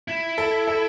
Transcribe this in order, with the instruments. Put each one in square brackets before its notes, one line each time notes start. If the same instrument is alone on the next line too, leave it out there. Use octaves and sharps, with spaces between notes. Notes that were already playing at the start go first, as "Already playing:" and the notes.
[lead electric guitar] E4
[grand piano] A4
A4